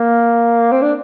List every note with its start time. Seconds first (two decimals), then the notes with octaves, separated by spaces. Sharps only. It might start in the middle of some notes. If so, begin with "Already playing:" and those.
Already playing: A#3
0.72 C4
0.82 D4